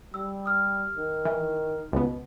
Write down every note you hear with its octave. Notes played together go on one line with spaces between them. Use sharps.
G3 E6
D#6 F6
D#3
E3
C#2 B2 B3